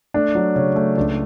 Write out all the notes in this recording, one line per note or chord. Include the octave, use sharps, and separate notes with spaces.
A3 D4
F#3
C#3 C#4
A3
C#2 D4